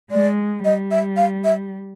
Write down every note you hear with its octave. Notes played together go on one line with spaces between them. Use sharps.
G#3 D5
G3 D#5
E5
F5
E5